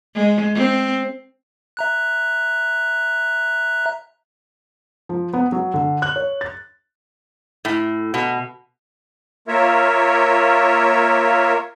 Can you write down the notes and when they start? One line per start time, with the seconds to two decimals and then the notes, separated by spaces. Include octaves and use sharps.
0.15 G#3
0.55 C4
1.77 E5 A#5 F#6
5.09 F3
5.33 B3
5.52 F#3
5.74 D3
6.02 F#6
6.16 C#5
6.41 A6
7.65 A2
8.14 B2
9.48 A#3 F4 A#4 C#5 E5